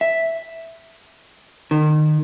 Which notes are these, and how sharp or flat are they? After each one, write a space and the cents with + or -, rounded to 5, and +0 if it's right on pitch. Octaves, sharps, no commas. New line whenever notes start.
E5 -5
D#3 -30